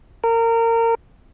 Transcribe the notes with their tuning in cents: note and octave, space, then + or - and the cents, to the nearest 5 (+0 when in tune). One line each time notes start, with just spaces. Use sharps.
A#4 -25